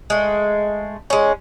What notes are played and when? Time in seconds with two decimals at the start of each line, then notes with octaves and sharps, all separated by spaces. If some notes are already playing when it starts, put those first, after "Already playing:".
0.10 G#3 A3
1.10 G#3 C#4